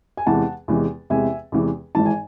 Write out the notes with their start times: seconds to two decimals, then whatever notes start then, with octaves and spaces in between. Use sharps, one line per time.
0.17 G#5
0.26 E2 C3 E3 G#3 F#5 A5
0.68 E2 C3 E3 G#3
1.10 E2 C3 E3 G#3 E5 G#5
1.52 E2 C3 E3 G#3
1.95 G#1 G#2 E3 A5
2.05 G#5